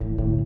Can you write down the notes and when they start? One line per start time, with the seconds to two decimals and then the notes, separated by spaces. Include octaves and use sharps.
0.01 A2 E3
0.18 A2 D3